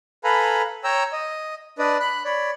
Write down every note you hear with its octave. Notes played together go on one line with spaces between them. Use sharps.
A4 B4 F5 G#5 A#5 B5
C#5 G5 A#5 E6
D#5
D4 B4 D5 D#5
B5 F#6
C#5 D5 B5